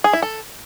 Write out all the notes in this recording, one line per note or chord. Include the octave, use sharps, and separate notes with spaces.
G#4
E4
A4